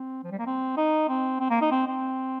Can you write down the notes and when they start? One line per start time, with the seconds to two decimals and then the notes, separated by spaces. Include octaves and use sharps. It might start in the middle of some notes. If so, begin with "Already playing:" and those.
Already playing: C4
0.24 F3
0.31 G3
0.39 A#3
0.46 C4
0.77 D#4
1.09 C4
1.40 C4
1.50 A#3
1.61 D#4
1.71 C4
1.87 C4